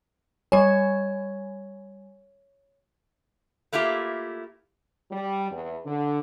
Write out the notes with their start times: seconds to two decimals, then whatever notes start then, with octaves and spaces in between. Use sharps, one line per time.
0.52 G3 C#5 G#5
3.73 A3 A#3 E4 F4 G4
5.11 G3
5.51 E2
5.85 D3